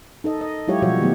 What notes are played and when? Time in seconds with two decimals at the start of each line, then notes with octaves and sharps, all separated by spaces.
0.24 D#4 A4 D#5
0.41 D#5
0.68 F#3 G#3 E4 F4 G4 C#5
0.82 B2 F3 G3 F#4 C#5
1.01 D#3 F#3 A3 B3